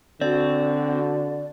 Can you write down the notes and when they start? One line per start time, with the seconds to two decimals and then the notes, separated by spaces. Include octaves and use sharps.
0.21 D3 C4 F#4 D5